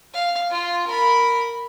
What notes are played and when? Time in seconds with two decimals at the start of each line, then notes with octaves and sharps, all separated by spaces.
0.14 F5
0.50 F4
0.87 A#4 B5